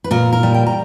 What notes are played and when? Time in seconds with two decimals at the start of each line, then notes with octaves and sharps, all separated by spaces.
0.04 B4
0.11 A#2 A#4
0.33 A#4
0.43 G3
0.54 G5
0.67 A#5